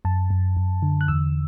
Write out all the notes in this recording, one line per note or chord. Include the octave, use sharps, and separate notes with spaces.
F#2 A5
F#2
F#2
D3
F#6
E2 E6